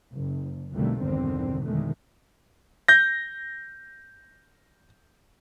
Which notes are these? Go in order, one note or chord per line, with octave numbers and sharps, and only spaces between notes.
F#1
B1 F2 D3 G3 A3 A#3
B1 E2 G2 D3 D#3 C4
F2 B2 D3 D#3 G#3 A3
G6 A#6